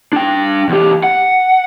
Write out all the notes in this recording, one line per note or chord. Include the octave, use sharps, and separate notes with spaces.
D4 G5
E2 G4
F#5